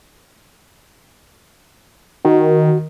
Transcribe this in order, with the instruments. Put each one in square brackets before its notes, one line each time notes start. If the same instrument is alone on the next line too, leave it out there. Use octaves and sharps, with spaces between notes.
[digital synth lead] D#3 [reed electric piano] F#4